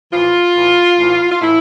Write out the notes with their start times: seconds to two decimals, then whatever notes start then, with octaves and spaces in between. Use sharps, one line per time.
0.13 A2 E3 F4
0.56 A2 E3
0.98 A2 E3
1.31 F4
1.42 A2 E3 E4